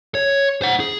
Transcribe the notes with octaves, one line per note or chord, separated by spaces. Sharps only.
C#5
C5 F#5
G#4